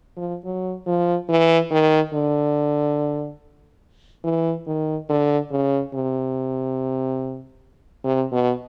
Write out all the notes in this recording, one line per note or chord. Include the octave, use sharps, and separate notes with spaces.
F3
F#3
F3
E3
D#3
D3
E3
D#3
D3
C#3
C3
C3
B2